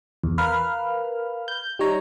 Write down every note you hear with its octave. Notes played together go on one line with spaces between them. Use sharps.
E2
A#4 B4 F5 B5 F6
G6
G3 D#4 C#5 A#5